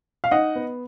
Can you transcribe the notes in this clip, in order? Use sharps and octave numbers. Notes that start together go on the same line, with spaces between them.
F5
D#4 D#5 F#5
B3